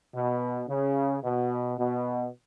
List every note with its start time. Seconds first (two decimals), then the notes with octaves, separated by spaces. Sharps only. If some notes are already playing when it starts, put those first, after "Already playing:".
0.14 B2
0.68 C#3
1.24 B2
1.78 B2